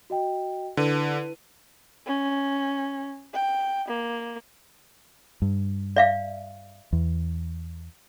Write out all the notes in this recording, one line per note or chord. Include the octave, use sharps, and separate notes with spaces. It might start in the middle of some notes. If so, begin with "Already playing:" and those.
F#4 D#5 G5
D3 E4 B4 D#7
C#4
G5
A#3
G2
D5 E5 F5
E2